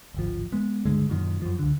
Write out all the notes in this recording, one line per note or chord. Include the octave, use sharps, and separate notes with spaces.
D1 G#1 F3
G#3 B3
C#2 G2 D3 G#3
F#2 A#2 D#3
F#2 F3
C#2 D3